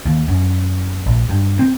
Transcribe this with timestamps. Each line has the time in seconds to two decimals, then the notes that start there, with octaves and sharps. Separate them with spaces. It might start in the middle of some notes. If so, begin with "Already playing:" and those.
0.06 D#2
0.28 F#2
1.06 A#1
1.29 G2
1.59 C4